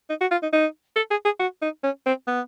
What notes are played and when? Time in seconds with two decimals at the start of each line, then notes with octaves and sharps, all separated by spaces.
0.09 D#4
0.21 F#4
0.31 F4
0.43 D#4
0.53 D#4
0.96 A4
1.11 G#4
1.25 G#4
1.40 F#4
1.62 D#4
1.83 C#4
2.06 C4
2.27 B3